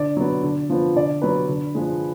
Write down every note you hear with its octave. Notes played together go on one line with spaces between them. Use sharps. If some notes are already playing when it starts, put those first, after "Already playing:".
Already playing: D3 D5
F#3 B3
D3
F3 B3
D3 D5
F#3 B3 B4
D3
F3 G#3